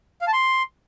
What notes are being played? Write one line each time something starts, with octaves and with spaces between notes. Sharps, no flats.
F5
A5
C6